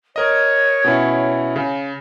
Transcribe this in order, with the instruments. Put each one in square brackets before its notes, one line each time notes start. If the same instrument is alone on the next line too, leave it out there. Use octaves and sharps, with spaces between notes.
[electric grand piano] A#4 D#5 [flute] C#5
[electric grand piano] B2 C#4 E4
C#3